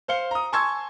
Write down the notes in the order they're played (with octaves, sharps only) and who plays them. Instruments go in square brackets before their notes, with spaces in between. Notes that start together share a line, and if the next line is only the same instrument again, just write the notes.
[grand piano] C5 F5 C#7 G7
A#5 D#6
G#5 A5 C6 C#6 E6 G#6